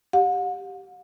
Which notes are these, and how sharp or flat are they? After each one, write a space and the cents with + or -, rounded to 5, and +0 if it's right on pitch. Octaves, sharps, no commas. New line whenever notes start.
G4 +0 F#5 -40